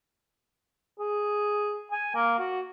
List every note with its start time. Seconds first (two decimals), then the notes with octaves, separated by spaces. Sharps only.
0.99 G#4
1.92 G#5
2.15 A#3
2.39 F#4